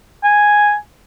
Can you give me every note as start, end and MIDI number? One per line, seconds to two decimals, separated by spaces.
0.24 0.74 80